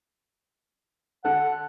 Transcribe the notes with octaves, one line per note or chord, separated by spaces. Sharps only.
D3 A4 F#5